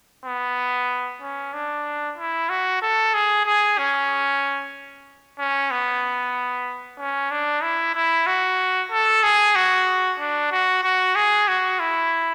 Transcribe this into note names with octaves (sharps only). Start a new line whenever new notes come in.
B3
C#4
D4
E4
F#4
A4
G#4
G#4
C#4
C#4
B3
C#4
D4
E4
E4
F#4
A4
G#4
F#4
D4
F#4
F#4
G#4
F#4
E4